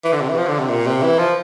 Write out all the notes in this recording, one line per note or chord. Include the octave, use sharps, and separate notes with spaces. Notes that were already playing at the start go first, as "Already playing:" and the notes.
E3
D3
C3
E3
F3
D3
C3
A#2
C3
E3
F3